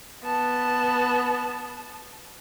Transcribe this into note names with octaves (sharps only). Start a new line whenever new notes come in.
B3 A5